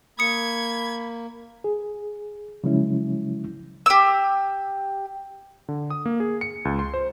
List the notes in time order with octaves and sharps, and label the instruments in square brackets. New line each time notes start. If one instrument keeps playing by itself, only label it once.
[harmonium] A#3 [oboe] B5 [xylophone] D#6 C#7 [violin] G#6
[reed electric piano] G#4
C#3 F3 F#3 G#3 C#4 E4
[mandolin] G4 E6
[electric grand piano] D3
D#6
A#3
G#4
C#7
C#2
C6
C5